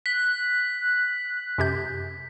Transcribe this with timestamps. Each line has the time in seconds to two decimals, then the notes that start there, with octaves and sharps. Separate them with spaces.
0.06 F#6 B6
1.58 F#2 C3 G6